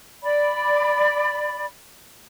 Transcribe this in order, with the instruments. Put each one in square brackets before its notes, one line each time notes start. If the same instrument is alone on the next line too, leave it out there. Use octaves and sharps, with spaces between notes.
[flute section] D5 B5